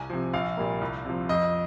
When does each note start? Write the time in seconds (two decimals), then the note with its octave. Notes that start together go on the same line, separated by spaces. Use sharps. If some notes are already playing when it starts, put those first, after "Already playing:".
Already playing: C2 G#5
0.10 C3 F3
0.33 A#1 F5
0.57 A#2 G3 A#3
0.81 C2
1.05 C3 F3
1.29 F2 D#5